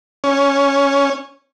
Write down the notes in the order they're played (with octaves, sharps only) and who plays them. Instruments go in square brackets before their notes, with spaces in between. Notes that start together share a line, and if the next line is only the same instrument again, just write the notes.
[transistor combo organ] C#4